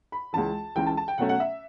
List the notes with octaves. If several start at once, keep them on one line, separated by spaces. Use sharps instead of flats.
B5
C#2 C#3 E3 A5
C#2 C#3 E3 G5
A5
A5
G5
B2 F#3 A3 C#4 F#5
F#5
E5